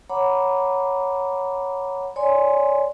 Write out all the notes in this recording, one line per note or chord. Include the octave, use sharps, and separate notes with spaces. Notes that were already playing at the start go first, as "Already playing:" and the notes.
C#5 F#5 A#5 B5 D6
C#5 D5 G#5 C6